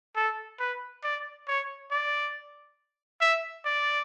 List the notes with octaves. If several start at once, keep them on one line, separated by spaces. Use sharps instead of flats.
A4
B4
D5
C#5
D5
E5
D5